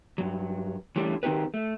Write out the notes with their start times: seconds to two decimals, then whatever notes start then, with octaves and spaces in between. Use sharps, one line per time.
0.18 G2 F#3
0.96 E3 G3 A3 C#4 D4
1.23 D#3 C4 D#4 F#4 G4 B4
1.54 A3